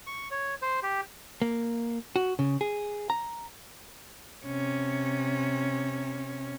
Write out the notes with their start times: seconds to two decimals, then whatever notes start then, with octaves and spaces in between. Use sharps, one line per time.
0.07 C#6
0.31 C#5
0.62 C5
0.83 G4
1.42 A#3
2.16 F#4
2.39 C#3
2.61 G#4
3.10 A#5
4.46 C3 C#4